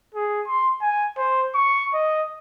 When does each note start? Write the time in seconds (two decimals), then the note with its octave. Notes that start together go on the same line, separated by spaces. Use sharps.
0.15 G#4
0.47 C6
0.82 G#5
1.18 C5
1.55 C#6
1.94 D#5